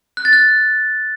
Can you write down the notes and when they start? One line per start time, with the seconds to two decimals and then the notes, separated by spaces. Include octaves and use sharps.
0.17 F#6
0.25 A6
0.33 F#6